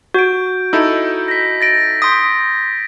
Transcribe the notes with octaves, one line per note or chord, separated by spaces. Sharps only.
F#4 G6 D7
D#4 E4 A4 E6
A#6 B6
A6 A#6 D7
C6 D#6 G6 B6